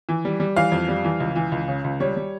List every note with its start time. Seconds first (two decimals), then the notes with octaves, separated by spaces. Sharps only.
0.09 E3
0.25 G3
0.40 G3
0.56 E3 F5
0.72 F2
0.88 G3
1.04 E3
1.20 C#2
1.36 E3
1.52 C#2
1.68 C#3
1.84 C#2
2.00 G3 C#5
2.17 G3